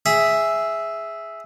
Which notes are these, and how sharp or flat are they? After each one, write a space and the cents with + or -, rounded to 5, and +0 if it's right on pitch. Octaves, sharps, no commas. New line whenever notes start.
G#4 +0 E5 +0